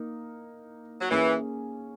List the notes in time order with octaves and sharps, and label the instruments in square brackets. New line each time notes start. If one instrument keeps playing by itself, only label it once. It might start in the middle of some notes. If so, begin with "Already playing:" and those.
Already playing: [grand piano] A#3 D#4 A#4
[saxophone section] F#3
[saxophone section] E3 [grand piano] A#3 C#4 G#4 C#5